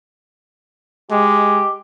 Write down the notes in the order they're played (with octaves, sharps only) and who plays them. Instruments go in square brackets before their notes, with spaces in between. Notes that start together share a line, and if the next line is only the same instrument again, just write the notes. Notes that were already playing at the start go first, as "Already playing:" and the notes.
[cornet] G#3 [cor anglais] G4